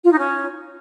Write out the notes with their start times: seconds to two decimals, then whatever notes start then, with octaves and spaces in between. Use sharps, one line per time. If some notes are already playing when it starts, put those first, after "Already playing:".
0.04 F4
0.11 D#4
0.19 C#4